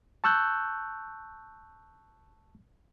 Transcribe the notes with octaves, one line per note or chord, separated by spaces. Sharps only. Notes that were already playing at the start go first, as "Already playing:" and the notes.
A5 C#6 E6 F#6 G6